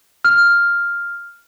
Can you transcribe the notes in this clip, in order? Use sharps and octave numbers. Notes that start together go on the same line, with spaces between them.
F6